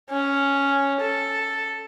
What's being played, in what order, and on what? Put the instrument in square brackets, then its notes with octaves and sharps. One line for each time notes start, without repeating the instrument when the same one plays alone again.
[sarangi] C#4
A4